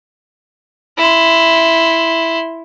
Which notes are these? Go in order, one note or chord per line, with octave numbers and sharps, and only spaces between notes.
E4 C6